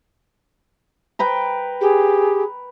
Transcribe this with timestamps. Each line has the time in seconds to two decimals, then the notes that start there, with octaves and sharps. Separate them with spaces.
1.19 A#4 B4 G5
1.81 G4 G#4